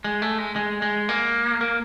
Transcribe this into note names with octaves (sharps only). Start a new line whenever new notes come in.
G#3
A3
G#3
G#3
G#3
A#3
A#3